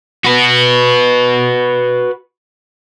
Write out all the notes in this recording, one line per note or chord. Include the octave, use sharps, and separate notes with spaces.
F#4 B4